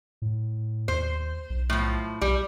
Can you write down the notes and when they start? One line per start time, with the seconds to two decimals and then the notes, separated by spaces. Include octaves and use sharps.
0.22 A2
0.88 D#2 C5
1.50 B1
1.70 A2 F3
2.22 B1 G3